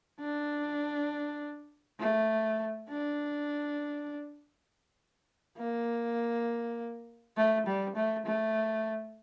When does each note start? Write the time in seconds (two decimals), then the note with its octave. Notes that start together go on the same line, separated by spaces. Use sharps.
0.20 D4
1.99 A3
2.89 D4
5.57 A#3
7.37 A3
7.66 G3
7.95 A3
8.26 A3